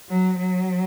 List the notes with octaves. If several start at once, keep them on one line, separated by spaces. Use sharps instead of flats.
F#3
F#3